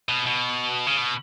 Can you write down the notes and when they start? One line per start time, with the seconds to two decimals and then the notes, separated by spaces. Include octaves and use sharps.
0.09 B2
0.26 B2
0.87 C#3
0.98 B2